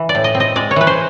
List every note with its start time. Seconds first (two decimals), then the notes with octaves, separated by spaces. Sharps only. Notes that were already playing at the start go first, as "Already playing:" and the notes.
Already playing: E3
0.09 D5
0.15 A2
0.24 D#5
0.35 C4
0.40 D#5
0.56 G#3 D5
0.71 C#5
0.76 E3 B4
0.87 C5